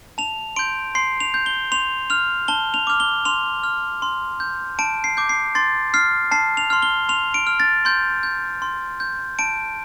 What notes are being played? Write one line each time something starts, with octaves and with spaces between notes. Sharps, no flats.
A5 F7
C6 G6 D7
C6 C7
F7
G6
G7
C6 F7
F6 F7
A5 G7
F7
D6 F6
G7
C6 F7
F6
C6
G6
A5 D7
C7
D6 G6
C7
C6 A6
F6 C7
A5 C7
F7
C6 F6
G7
C6 F7
D7
F6
A6
C6 G6
G6
C6
G6
A5 D7